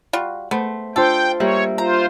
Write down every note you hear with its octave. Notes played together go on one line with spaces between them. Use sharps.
G3 F4 F#4
A3 B3 C5
D4 F4 A4 C5 G5
G3 A#3 C#5 E5
F4 C5 A#5